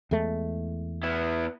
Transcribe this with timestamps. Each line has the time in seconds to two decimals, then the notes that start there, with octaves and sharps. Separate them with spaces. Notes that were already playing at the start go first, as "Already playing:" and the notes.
0.11 E2 G#3 A3
1.03 B3 E4